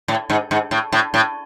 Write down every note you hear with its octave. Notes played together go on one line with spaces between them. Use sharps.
A2
G#2
G#2
A2
A2
A2